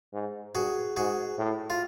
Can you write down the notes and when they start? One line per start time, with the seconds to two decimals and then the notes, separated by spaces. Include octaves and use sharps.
0.13 G#2
0.55 G2 F#4 G#4
0.97 G#2 F#4 G#4
1.39 A2
1.70 F4